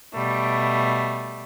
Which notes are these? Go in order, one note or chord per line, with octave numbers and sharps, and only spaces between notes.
B2 G3 A3